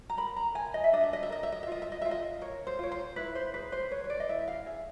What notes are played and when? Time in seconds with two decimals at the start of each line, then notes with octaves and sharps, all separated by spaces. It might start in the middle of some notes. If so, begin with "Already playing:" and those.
0.10 A#5
0.17 A#4 B5
0.36 A#5
0.55 A#4 G#5
0.74 D#5
0.84 E5
0.93 D4 D#5
1.03 E5
1.13 D#5
1.23 E5
1.30 A#4 D#5
1.43 E5
1.52 D#5
1.63 E5
1.67 F4 D#5
1.82 E5
1.92 D#5
2.02 F4 E5
2.11 D#5
2.41 A#4 C#5
2.67 C5
2.79 F4 C#5
2.92 C5
3.16 E4 B4
3.35 C5
3.54 G#4 B4
3.72 C5
3.91 B4 C#5
4.04 C#5
4.10 D5
4.20 D#5
4.29 E4 E5
4.48 F5
4.66 G#4 E5